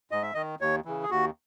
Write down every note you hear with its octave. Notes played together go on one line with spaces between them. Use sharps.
G#2 D#5
E5
D#3 D#5
D#2 C#5
C#3 E3
G#4
D#2 F#4